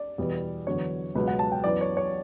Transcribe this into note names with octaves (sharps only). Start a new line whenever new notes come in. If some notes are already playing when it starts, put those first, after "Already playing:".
Already playing: D5
E2 B2 G3
E2 D3 F#3 B3 D4 C#5
C#2 B2 F#3 B3 B4
F#5
A5
G5
F#2 E3 B3 D5
C#5
C#5